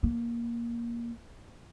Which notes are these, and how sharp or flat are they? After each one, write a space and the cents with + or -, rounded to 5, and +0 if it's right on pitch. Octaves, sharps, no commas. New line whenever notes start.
A#3 +10